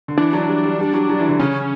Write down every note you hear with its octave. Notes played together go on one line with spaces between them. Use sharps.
D3
E3 D4
F#3
G3
G3
G3
F#3
F#3
E3
D3
C#3 C#4